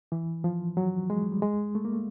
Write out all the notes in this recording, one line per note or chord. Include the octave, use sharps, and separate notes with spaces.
E3
F3
F#3
G#3
G3
G#3
A3
A#3
A3